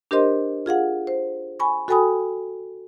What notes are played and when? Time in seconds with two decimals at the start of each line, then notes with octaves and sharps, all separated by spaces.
0.11 D4 G4 A#4 C5 D#5 C6
0.66 F4 G#4 F5 F#5
1.07 C5
1.60 G#5 B5 C#6
1.88 F#4 A4 G5 G#5 B5 D#6